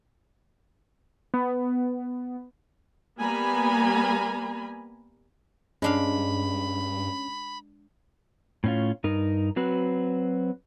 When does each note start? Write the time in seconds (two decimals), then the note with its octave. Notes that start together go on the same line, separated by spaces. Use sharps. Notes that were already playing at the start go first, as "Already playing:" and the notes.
1.34 B3
3.19 G3 A#3 B3 G#5 A#5 B5
5.82 G2 G#3 C#4 D4 F5 B5
8.64 A2 C#4 F4
9.04 G2 D#4 A#4
9.56 F#3 C4 F#4 B4